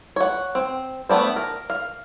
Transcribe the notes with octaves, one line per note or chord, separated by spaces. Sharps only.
C#5 F#5
C4
A3 B3 D4 C5
A#4
F5